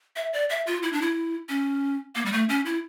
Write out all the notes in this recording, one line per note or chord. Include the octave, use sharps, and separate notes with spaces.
E5
D5
E5
F4
E4
D4
E4
C#4
A#3
G3
A3
C#4
E4